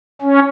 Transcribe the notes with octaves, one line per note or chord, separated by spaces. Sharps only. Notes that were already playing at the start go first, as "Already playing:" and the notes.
C#4